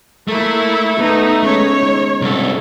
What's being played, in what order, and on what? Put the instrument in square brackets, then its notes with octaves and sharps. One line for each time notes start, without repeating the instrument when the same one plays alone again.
[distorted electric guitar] A3 [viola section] A#3 E4
[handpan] B3 A4 [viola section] D#4
[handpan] G#3 C#4 [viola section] C#5
[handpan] D#4
[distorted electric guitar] C2 A4